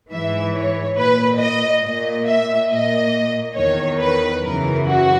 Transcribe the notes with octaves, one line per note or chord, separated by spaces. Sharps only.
G#2 E3 E5
C#5
A#2 B4
D#5
A#2 D#5
E5
A#2 D#5
E2 D#3 C#5
B4
F#2 C#3 E3 A#4
F#4